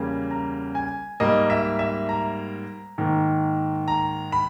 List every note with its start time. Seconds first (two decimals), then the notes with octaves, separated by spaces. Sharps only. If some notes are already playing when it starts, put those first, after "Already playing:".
Already playing: E2 C#3 G3 A#3 G#5
0.31 A#5
0.75 G#5
1.20 G#2 G3 A#3 D#5
1.50 E5
1.79 E5
2.09 A#5
2.98 G#2 D#3 A#3
3.88 A#5
4.32 B5